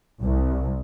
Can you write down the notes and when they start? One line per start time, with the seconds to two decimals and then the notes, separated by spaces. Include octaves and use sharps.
0.22 C2